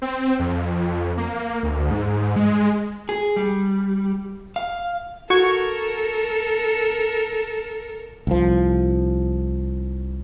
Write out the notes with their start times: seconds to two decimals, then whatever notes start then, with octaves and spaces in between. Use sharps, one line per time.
0.02 C4
0.39 F2
1.18 A#3
1.63 D2
1.91 G#2
2.36 G#3
3.09 G#4
3.36 G3
4.56 F5
5.30 F#4 A4 A#4 C#6 G#6
8.27 C2 F3